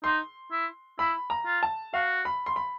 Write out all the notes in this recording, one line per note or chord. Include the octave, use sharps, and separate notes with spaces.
D#4 C6
E4
E4 B5
A#5
F4
A5
F#4 F5
B5
C6
B5